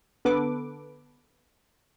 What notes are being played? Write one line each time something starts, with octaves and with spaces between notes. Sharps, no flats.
D3 B3 A4 B4 D6